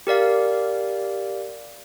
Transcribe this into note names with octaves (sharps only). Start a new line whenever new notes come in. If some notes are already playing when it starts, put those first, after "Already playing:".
G4 A#4 D5 F5